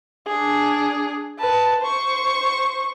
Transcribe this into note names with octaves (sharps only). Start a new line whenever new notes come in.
D4 G#4
B4 A5
C5 C#6